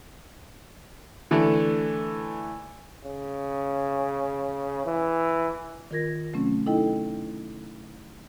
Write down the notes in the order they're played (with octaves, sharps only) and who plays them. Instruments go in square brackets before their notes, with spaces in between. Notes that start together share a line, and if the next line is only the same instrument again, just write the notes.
[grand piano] D3 E3 A3
[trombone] C#3
E3
[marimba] D#3 F4 A#4 G#6 A#6
C3 F#3 A3 C4 C#4
D#4 E4 A4 D#5 G5